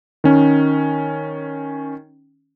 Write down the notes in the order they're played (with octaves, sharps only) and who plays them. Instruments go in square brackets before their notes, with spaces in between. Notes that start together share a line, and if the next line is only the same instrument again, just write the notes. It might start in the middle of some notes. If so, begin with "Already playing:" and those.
[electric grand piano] D#3 C#4